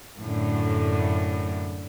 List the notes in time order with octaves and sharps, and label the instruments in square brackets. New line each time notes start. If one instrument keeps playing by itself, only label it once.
[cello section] F#2 A2 D3